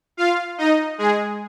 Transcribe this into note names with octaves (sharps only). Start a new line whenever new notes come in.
F4 F5
D#4 D#5
G#3 G#4